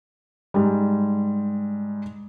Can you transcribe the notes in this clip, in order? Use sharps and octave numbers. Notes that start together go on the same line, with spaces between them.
G#2 G3